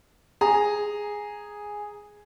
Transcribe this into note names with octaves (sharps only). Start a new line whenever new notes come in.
G#4 A#5